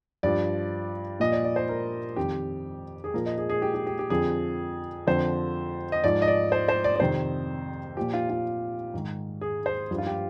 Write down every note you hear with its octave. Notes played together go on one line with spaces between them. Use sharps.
G2 F3 D5
A#2 F3 D#5
D5
D5
C5
A#4
F2 D#3 G4
G#4
A#2 F3 A#4
D#5
G#4
G#4
G4
G4
G4
G4
F2 D3 F3 G#4
F2 D3 F3 C5
D#5
G#2 F3 D5
D#5
D5
C5
C5
D5
D5
F2 C3 D#3 C5
A#2 F3 G4
F4
F4
G#2 D#3
G#4
C5
G2 F3
F4
G4